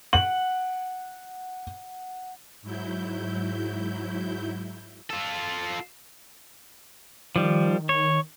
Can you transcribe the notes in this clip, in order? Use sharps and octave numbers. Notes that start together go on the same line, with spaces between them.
F#5 F#7
G#2 F#3 E4 G6
F4 A4
D#3 F3 G3
C#5